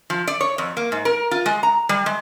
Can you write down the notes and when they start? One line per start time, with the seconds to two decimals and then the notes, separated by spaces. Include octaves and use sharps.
0.10 F3
0.27 D5
0.41 C#5
0.58 F2
0.77 A#3
0.92 G#2
1.05 A#4
1.31 F4
1.46 G#3
1.63 A#5
1.89 G3
2.06 G#3